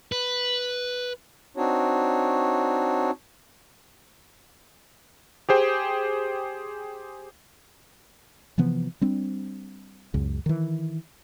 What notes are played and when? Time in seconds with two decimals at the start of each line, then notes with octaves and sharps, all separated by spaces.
0.12 B4
1.57 C4 D4 D#4 F#4 C#5
5.49 G4 G#4 C5 G5
8.58 C3 E3 F3 B3
9.01 G3 C4 D4
10.14 C#2 F#2 C#3
10.46 D#3 E3